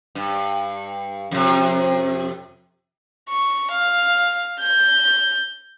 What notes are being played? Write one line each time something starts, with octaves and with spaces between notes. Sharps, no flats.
G2
F2 C3
C#6
F5
G6